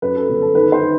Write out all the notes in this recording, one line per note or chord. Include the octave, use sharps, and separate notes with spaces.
F#2 B4
A4
G1
A4
D#3 B4
C5
D#3